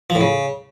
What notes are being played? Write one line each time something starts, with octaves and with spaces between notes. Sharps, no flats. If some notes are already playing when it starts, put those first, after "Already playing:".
F3
A2
C#3